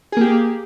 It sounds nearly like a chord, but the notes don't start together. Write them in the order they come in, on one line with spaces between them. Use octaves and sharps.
G#4 A#3 G4